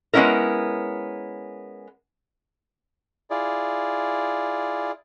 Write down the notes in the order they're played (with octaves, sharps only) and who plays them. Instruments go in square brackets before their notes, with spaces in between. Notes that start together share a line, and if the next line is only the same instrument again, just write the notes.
[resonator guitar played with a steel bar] G#3 B3 C#4 E4 A#4
[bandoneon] E4 F4 G#4 D5